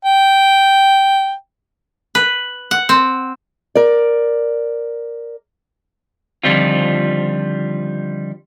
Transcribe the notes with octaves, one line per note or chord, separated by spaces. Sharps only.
G5
B4
F#5
C4
A#4 D5
D3 D#3 F3 G3 C4 F4